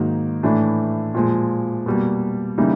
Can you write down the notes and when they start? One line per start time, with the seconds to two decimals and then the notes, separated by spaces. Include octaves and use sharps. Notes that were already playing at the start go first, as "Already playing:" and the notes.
Already playing: G#2 D#3 F#3 A#3 D#4
0.43 A2 E3 A3 D4
1.14 A#2 F3 G#3
1.86 B2 G3 A#3
2.58 C#3 E3 G3 A#3 D#4